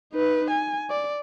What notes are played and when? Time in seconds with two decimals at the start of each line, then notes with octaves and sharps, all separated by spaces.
0.13 D#4 B4
0.50 G#5
0.90 D5